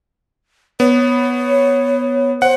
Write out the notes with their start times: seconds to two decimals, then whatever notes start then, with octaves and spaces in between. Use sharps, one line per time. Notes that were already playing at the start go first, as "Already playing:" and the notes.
0.80 B3 C#5
2.42 C5 F#5